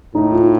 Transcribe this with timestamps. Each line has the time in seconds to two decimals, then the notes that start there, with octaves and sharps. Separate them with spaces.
0.14 A2 D#4
0.32 F4